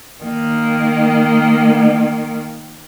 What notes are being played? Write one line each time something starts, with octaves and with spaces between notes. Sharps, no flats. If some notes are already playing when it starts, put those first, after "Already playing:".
D#3 A#3